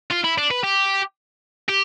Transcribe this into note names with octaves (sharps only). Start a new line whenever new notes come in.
F4
E4
D4
B4
G4
G4